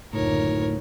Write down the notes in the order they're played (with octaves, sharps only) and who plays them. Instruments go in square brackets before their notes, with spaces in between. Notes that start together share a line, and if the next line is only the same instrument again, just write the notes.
[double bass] F#1 D2 [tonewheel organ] A2 [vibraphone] D#4 F4 [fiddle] A#4 C#5